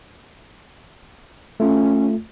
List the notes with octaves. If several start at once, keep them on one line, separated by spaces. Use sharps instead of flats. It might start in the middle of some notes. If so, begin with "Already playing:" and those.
A3 C#4 F4